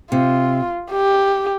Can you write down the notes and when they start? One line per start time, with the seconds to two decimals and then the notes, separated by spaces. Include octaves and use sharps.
0.11 C3 F4
0.92 G4